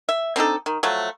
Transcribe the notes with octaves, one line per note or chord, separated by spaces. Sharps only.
E5
C4 D4 D#4 A4
D#3
F3 F#3 A3